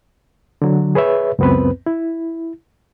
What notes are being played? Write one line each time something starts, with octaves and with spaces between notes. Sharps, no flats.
D3 F#3
G#4 B4 C#5 E5
C#2 F#2 B3 C4 B4
E4